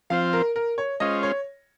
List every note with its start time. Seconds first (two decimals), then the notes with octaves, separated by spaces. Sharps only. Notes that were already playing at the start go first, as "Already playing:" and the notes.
0.10 F3 C4 F4 C5 F5
0.33 A#4
0.56 A#4
0.78 C#5
1.00 G#3 C#4 F4 C5 D#5
1.23 C#5